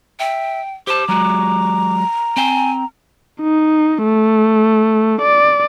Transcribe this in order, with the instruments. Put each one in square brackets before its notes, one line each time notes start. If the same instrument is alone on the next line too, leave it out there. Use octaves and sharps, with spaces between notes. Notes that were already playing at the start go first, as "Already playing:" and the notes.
[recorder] E5 [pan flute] G5
[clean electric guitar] G4 A5 [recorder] C5 [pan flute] D6
[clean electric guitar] F#3 G#3 F#4 [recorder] A#5
[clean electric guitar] C4 G5 [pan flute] G#5
[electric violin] D#4
A3
D5